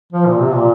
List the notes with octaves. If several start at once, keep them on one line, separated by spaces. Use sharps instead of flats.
F3
A#2
C3
A#2